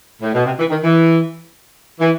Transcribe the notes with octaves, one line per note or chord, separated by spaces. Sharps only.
A2
B2
C3
E3
D#3
E3
E3